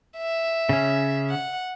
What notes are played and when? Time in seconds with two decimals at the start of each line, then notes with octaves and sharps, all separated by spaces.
0.18 E5
0.69 C#3 C#4
1.30 F#5